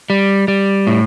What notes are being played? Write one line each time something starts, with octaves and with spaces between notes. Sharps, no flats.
G3
G3
A2